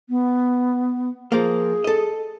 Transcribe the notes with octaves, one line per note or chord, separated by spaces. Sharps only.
B3
F3 A#3 G#4
A4 D#5